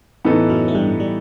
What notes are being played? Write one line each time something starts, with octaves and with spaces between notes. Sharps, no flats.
A2 E3 B3 D#4 A4
F#2 F#3
A3
G2 G3
G3